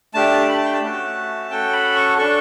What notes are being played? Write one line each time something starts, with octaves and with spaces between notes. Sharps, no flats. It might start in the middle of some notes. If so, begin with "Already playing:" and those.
A3 D4 G4 A5
B5
A5
G5
A5
A3 C#4 F#4
C#4 F#4 A4 G5
B5
C#6
D4 A4 C#6